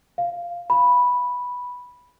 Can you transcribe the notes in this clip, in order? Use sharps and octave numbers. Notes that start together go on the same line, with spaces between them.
F5
B5